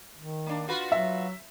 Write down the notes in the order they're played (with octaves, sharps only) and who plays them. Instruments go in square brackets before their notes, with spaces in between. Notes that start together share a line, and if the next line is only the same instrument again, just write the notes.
[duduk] D#3
[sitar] A#3 D4
F4 F#4 B4
[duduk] F#3 [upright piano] E5